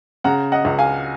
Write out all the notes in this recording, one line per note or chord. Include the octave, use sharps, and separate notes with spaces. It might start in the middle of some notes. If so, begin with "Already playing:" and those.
C#3 F#5 A#5
D#5 F#5
C#2
F5 G#5